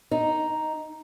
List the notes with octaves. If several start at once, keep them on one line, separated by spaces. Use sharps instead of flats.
D#4